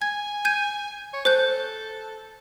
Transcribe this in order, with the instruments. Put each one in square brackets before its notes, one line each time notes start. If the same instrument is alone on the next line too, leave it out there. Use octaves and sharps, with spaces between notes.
[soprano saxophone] G#5 [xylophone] G#6
[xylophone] G6 G#6 D#7
[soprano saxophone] C#5
[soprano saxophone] A4 [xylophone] C5 F#6 G6